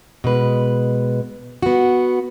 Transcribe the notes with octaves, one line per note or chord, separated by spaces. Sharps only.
B2 G#3 B4
B3 F#4